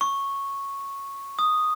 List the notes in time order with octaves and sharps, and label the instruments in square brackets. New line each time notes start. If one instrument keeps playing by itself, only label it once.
[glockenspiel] C#6
D#6